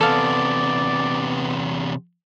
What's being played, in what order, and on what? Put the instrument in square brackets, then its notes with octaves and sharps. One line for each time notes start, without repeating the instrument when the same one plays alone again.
[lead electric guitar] E2 C3 [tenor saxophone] B3 [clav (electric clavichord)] A4 F5 [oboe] D5